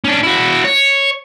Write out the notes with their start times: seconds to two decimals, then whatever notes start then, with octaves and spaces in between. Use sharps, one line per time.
0.04 C#4 D4
0.23 E4 F#4
0.64 C#5